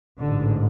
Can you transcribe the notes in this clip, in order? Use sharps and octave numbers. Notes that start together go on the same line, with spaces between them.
A1 G#2 D3